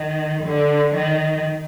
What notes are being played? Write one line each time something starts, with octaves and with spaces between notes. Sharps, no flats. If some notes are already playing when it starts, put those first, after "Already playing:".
Already playing: D#3
D3
D#3